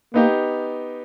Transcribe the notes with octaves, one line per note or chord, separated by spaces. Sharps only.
A#3 B3 D#4 G4